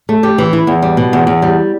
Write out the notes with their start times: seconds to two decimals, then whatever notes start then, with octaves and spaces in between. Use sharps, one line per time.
0.09 A3
0.23 G4
0.38 E3
0.53 E4
0.67 E2
0.82 G3
0.97 B2
1.13 E2
1.27 E2
1.42 G3